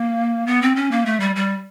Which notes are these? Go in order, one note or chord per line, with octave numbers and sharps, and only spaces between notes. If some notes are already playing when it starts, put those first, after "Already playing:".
Already playing: A#3
B3
C4
C#4
A#3
A3
G3
G3